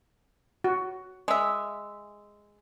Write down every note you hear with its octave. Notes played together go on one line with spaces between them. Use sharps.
F#4
G#3 E5